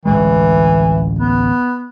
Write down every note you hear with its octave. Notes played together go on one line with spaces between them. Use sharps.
A1 D2 E3 G#3
B3